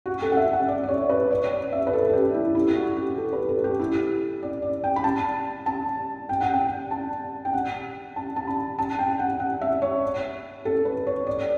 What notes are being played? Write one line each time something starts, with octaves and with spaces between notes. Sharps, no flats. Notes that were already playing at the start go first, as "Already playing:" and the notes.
F#4
A4
F#5
E5
F#5
D5
D5
C#5
B4
C#5
D5
E5
B4
A4
A4
G4
E4
E4
F#4
G4
A4
B4
A4
G4
E4
D5
D5
G5
B5
A5
A5
G5
F#5
G5
A5
G5
F#5
A5
A5
B5
A5
G5
F#5
F#5
E5
C#5
A4
B4
C#5
D5